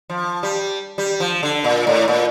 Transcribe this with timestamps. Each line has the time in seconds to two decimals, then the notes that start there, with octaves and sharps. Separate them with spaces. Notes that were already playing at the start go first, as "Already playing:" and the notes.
0.10 F3
0.43 G3
0.98 G3
1.20 F3
1.43 D3
1.64 A#2
1.87 A2
2.08 A#2